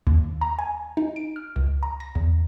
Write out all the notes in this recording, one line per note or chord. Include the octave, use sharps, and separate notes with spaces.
D#2
A#5
G#5
D#4
D7
F6
C#2
A#5
A#6
E2